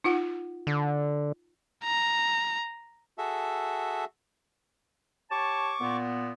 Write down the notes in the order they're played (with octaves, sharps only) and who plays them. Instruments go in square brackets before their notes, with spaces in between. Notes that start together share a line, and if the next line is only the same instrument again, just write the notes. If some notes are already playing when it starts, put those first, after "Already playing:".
[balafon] D#4 F4 F#5
[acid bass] D3
[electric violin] A#5
[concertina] F#4 G#4 A4 E5
[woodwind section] G4 C#5 A5 [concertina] C#6 D6
[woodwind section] A#2 B3